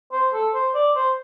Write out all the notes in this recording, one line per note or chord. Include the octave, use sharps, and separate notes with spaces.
C5
A4
C5
D5
C5